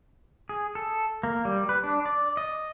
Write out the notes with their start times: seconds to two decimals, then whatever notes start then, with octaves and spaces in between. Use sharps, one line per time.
0.49 G#4
0.75 A4
1.23 A#3
1.45 G3
1.69 B4
1.83 D4
2.06 D5
2.37 D#5